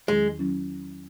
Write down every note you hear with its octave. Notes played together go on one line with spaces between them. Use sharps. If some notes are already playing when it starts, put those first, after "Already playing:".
E2 D#3 F#3 G#3 C#4 E4
D#3 F#3 C#4 E4